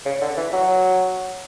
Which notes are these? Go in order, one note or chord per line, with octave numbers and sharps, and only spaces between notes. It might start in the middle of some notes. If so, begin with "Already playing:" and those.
C#3
D3
E3
F#3